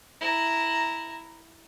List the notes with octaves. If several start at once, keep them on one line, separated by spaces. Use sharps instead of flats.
E4 A#5